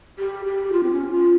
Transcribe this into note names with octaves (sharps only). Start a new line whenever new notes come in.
G4
G4
F4
C4
C#4
F4